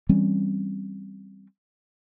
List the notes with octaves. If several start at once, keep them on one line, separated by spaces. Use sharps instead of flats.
E3 G3 C4 C#4